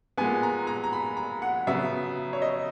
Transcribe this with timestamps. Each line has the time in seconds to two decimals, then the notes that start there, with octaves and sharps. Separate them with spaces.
0.17 A#2 G#3 B3 G#5
0.43 A#5
0.67 A#5
0.84 A#5
0.93 B5
1.17 A#5
1.42 F#5
1.67 C#3 F#3 B3 E5
2.33 C#5
2.42 D#5